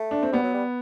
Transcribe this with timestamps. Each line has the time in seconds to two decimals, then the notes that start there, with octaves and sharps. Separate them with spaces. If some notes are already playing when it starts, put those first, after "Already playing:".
Already playing: A3
0.11 D4
0.23 C4
0.32 G3 B3
0.43 F#3
0.54 G3